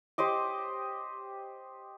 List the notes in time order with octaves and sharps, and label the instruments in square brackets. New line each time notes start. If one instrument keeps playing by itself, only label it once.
[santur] G4 C5 D#5 D6